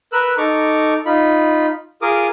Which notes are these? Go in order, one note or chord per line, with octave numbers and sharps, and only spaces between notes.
A#4 B4 E6 F#6
D#4 A4 A#5 C#6 D6
D#4 F4 B5
F4 G#4 A#4 D6 D#6